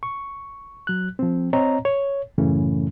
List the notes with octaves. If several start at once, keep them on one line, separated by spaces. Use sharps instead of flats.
C#6
F#3 F#6
F3 C4
C4 C#5 D#5 A#5
C#5
F#2 A2 C#3 E3 A3 C#4